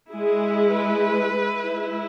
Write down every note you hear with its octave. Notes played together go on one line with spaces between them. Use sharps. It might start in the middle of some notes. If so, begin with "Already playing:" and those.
G#3 E4 G#4
B4
G#3 E4